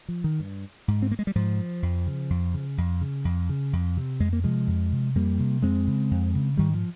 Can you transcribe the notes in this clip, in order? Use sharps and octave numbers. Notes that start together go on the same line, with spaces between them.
F3
D#3
G2
G#2
C4
A#3
G#3
G3
G#2 F3
F2
C#3
F2
C#3
F2
C#3
F2
C#3
F2
C3
F2 G#3
A#3
C3 F3 G#3
F2
C3
F2 G3 A#3
C3
F2 G#3 C4
C#3
F2
C#3
G#2 D#3 G3
F3